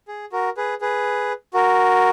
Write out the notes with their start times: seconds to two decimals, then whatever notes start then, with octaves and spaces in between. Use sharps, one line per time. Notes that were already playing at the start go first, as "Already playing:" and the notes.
0.08 G#4
0.32 F#4 A#4
0.57 G#4 B4
0.81 G#4 B4
1.54 F#4 A#4